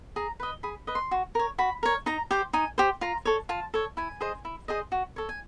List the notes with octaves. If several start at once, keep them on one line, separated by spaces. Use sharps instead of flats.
G#4 A#5
B4 D#5
G#4 B5
B4 D#5
C6
F#4
A#4 C#5
F#4 B5
A#4 C#5
D#4 A#5
G4 C5
D#4 G#5
G4 C5
F4 A#5
A4 C#5
F4 A5
A4 C#5
E4 G#5
G#4 C5 D#5
E4
G#4 C5 D#5
F#4
A4 C#5
G#5